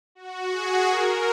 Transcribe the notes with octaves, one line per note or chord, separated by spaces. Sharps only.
F#4
G#4
A#4